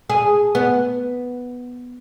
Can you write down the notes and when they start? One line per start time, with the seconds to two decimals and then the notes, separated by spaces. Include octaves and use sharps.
0.10 G#4
0.55 B3